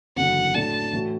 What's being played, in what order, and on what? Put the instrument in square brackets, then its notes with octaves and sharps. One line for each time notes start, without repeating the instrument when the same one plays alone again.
[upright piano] F#1 E2 D3 F#3 [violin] F#5
[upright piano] A2 A3 D4 F#4 [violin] A5
[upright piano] A2 E3 A3 F#4